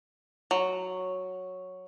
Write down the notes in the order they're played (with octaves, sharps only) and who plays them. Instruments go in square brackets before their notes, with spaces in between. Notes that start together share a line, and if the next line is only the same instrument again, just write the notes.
[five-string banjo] F#3